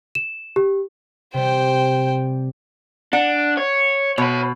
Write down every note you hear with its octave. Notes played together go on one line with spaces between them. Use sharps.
E7
G4
C3 G3 C5 G5
D4 F#5
C#5
B2 C#5 B5